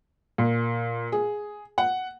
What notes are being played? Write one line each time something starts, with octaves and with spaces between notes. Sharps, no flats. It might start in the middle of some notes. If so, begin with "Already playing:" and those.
A#2
G#4
F#5